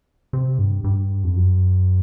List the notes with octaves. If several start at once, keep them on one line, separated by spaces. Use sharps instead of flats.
C3
G2
G2
F2
F#2